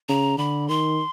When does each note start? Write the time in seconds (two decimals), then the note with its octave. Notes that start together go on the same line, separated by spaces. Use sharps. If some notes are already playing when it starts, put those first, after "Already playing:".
0.09 C#3 A#5
0.38 D3 B5
0.68 D#3 C6